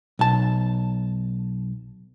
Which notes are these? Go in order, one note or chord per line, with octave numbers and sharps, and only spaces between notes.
B1 A5